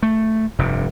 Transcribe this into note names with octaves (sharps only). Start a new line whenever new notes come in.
A3
F1 G2 C3